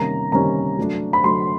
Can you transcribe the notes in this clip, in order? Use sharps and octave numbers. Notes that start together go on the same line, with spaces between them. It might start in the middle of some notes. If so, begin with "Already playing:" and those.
Already playing: C3 D#3 G3 A#3 C#4 A#5
C3 D#3 G3 A#3 C#4 A#5
F#3 A3 D4
B5
F#3 A3 D4 C6